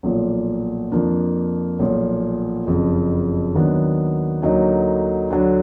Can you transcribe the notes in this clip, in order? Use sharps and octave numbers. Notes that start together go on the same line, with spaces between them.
B1 A#2 F3
F2 F3 A#3 D4
B1 A#2 F3
F#1 F2 F3
D#2 D#3 F#3 B3 D4
D2 D3 F#3 A#3 D#4
D2 D3 F#3 D4